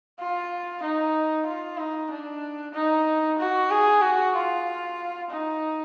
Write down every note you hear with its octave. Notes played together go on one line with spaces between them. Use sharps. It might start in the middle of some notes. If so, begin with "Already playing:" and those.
F4
D#4
F4
D#4
D4
D#4
F#4
G#4
F#4
F4
D#4